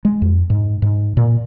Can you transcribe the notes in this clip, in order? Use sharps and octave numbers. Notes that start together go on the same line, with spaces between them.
G#3
F2
G#2
G#2
A#2